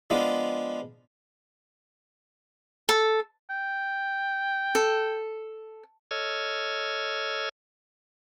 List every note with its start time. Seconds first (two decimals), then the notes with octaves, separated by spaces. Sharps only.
0.10 F3 G#3 B3 D4 F4
2.89 A4
3.50 G5
4.75 A4
6.11 A4 C#5 D#5 E6 F6 G#6